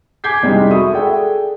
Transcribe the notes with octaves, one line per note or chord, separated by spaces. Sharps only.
G#5 D6 G6 G#6 B6 C7
F2 C3 G3 G#3 D#4 E4
F#4 A4 E5 B5 C#6 D#6
G#4 A4 D5 E5 F#5 G5